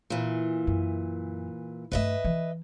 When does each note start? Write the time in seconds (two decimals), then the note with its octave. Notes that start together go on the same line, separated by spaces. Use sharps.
0.10 A#2 E3
0.67 F#2
1.92 G2 A3 B4 D#5 E5
2.24 E3